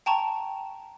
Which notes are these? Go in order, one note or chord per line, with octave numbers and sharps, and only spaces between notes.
G5 A5 A#5 C#6